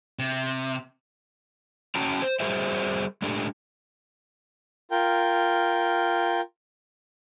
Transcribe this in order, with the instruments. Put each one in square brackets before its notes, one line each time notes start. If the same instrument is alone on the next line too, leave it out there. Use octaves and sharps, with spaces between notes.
[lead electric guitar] C3
[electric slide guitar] C#4 F#4 G5 A5 A#5
C5
G3 F#4 G#4 A#4 C5 E5
G#3 A3 D4 G4
[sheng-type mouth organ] F4 A#4 G5